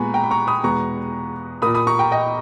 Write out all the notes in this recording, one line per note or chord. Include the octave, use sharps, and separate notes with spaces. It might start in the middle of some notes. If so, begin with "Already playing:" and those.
Already playing: A#2 G#3 B3 G#5 A#5 B5 C#6
G5 A#5
B5
A#5 C#6
B5 D#6
E2 B2 G#3 B3 A#5 C#6
A#2 A#3 B5 D#6
B5 D#6
A#5 C#6
G5 A#5
D#5 G5